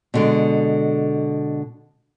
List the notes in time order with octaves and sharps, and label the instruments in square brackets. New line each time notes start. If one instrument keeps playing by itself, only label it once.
[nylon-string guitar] B2 D3 G#3